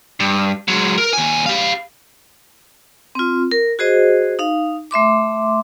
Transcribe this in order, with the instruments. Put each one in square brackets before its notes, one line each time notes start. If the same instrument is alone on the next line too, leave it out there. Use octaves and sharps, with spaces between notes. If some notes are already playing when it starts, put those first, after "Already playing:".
[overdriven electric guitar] G2
F#3 G#3
A#4
D#2 G#5
G4 F5
[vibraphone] C4 F4
A#4
F#4 G#4 C5 D#5
D#4 F5
A3 E5 C6 D6